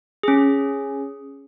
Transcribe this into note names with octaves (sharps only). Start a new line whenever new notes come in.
C#4 G#4